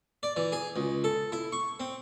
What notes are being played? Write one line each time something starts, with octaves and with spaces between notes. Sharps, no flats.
D5
E3
G#4
C#2
A4
E4
C#6
C4